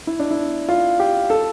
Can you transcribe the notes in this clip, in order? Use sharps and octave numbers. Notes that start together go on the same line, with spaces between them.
E4
D4
E4
F4
G4
A4